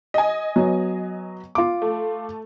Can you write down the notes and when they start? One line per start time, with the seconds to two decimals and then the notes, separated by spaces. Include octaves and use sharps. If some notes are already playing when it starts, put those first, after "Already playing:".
0.14 D#5 G#5
0.56 F#3 B3
1.55 F4 D6
1.82 A3